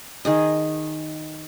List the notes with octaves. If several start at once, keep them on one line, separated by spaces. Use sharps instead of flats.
D#3 G#4 D#5